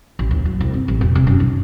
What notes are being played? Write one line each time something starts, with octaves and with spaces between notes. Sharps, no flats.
A1
D#2
F#2
C2
C4
A1
E1
C3
F#2
D#4